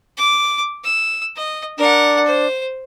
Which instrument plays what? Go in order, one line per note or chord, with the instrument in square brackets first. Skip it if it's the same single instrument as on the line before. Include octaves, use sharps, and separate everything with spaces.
[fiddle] D6
E6
D#5
[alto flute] D4 [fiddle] A#4 F#5
[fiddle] C5